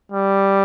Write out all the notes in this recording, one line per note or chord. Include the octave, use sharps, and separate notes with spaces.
G3